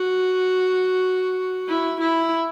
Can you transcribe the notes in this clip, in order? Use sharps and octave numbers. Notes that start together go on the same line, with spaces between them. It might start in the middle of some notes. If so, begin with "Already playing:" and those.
Already playing: F#4
E4
E4